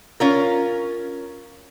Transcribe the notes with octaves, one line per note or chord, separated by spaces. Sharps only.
C#4 F4 A#4